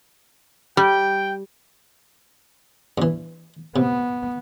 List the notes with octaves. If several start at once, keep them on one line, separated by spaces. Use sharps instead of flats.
G3 G5
G2 E3
C3 B3